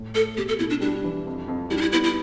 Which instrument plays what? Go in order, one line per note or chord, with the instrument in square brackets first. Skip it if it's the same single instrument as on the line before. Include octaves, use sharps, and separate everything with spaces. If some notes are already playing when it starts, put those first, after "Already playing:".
Already playing: [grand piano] A2
[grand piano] A3 [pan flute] A4
[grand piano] B2 [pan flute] G4
[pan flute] A4
[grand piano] B2 [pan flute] E4
[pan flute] D4
[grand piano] G3 [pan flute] D4
[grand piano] E3
F2
F2
[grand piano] G3 [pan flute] E4
[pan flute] D4
E4
[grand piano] B3 [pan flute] E4
[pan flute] E4